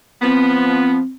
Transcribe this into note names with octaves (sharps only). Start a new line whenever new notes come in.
F3 B3 C4